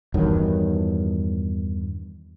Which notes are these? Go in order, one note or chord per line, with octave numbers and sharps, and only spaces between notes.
E2 G2 D#3 F#3